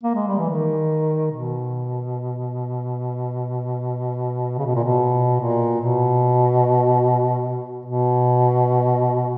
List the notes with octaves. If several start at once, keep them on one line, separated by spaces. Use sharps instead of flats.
A#3
G#3
G3
E3
D#3
B2
C#3
B2
A#2
B2
A#2
B2
B2